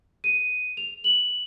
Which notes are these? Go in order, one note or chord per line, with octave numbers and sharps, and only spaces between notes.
D#7
F7
F#7